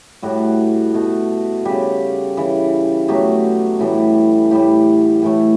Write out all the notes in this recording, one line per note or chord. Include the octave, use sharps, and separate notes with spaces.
A2 G3 F#4
B2 A3
C#3 G3 G4
C#3 E3 G3
B2 F#3 A3 G4
A2 E3 G3
A2 E3 G3 G4
A2 E3 A3